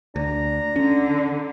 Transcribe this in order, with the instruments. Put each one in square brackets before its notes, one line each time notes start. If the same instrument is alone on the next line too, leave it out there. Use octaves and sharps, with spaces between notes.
[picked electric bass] D2 [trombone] D4 [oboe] A#5
[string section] D3 [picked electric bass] C#4